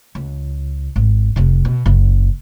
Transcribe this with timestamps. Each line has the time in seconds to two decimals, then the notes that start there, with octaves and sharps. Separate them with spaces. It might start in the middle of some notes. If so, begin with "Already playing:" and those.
0.15 C#2
0.96 G#1
1.36 F1 C3
1.65 B2
1.86 F#1 C#3